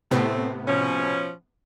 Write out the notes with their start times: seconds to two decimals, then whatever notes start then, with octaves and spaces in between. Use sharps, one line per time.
0.11 A2 C3 A3 B3 C4
0.67 B2 F3 C#4